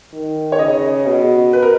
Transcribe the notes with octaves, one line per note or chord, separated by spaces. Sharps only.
D#3
C#5
C#3 D#5
B2
B4
A#4